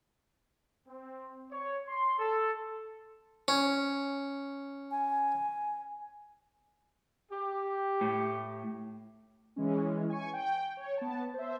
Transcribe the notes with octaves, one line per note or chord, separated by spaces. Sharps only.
C4
C#5
C6
A4
C#4
G#5
G4
A2
E3 G#3 C#4
G#5 C#6
G5
C#5
B3 A5
C5 E5